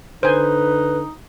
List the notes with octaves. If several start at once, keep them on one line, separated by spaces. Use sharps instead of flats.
D3 D#4 B4 C5 G#5